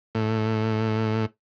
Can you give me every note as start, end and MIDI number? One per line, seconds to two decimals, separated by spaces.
0.15 1.26 45